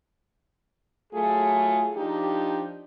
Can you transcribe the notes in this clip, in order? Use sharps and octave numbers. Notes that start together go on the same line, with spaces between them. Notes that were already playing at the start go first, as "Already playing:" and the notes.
F#3 A3 F4 G#4
F3 D4 D#4 G4